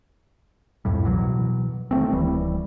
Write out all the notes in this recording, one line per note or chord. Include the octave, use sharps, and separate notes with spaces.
C2 F2 A2 G3
B2 E3 F#3
D#3 F#3 A3 C4
D1 E3 G3